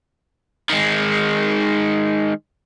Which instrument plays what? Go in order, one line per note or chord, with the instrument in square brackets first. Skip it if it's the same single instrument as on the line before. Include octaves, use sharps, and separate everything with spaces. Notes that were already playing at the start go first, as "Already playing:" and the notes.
[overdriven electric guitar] D#3 G#3